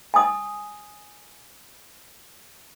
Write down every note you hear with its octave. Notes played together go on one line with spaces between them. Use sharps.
G#5 D#6